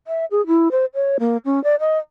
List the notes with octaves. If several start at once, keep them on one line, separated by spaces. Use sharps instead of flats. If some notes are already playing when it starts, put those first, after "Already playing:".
E5
G#4
E4
C5
C#5
A#3
C#4
D5
D#5